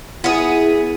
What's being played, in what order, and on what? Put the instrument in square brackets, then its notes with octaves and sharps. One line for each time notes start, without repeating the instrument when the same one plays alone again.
[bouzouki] B3 G#4 [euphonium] E4